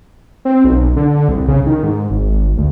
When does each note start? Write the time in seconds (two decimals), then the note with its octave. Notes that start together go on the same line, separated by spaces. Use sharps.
0.45 C4
0.65 B1
0.96 D3
1.28 C2
1.48 C#3
1.66 D#3
1.83 G#2
2.10 G#1
2.57 D2